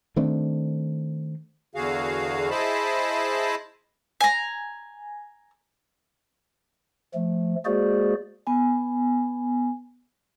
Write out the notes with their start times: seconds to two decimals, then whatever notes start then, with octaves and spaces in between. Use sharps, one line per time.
0.16 D#3 A3 C4 D4
1.75 E2 D3 F#4 G#4 F5
2.50 E4 G#4 C5 D#5 A5 B5
4.21 G#5 A#5
7.14 F3 A3
7.65 G#3 A#3 F#4 G#4 C5 D5
8.47 B3 G#5